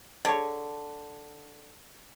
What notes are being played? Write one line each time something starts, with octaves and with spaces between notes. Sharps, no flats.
D3 G#4 C#5